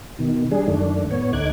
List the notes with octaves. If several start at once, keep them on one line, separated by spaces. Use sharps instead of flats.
B2 D#3
G3 D4 G#4
F#2 D#3 A3 D4
A2 B3 C#5
D2 A3 D#4 D6 F#6 G#6